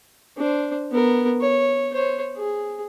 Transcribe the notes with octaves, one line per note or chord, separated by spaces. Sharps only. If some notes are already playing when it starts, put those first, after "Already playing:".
D4 C5
B3 A#4
C#5
C5 C#5
G#4